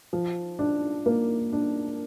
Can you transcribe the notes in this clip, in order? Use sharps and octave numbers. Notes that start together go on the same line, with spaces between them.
F3
D4
A#3
D4